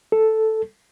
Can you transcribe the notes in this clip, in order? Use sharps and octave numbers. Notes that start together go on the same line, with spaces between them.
A4